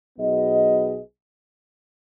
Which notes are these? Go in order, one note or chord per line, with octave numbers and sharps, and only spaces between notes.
B1 B2 B3 G#4 D#5